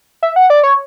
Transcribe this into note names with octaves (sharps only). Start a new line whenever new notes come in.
E5
F#5
D5
C#5